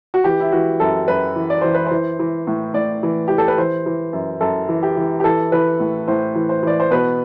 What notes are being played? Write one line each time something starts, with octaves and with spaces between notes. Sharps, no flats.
F#4
E3 G4
E4
E3 F#4
F#2 A4
F#2 B4
E3
D5
E3 C5
B4
E3 C5
E3
A2
A2 D5
E3
E3 G4
A4
B4
E3 C5
E3
F#2
F#2 A4
E3
G4
E3
G4
E3 A4
E3 B4
A2
A2 C5
E3
C5
E3 D5
C5
B2 B4